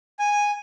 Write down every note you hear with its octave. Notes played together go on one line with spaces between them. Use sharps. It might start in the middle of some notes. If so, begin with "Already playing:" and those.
G#5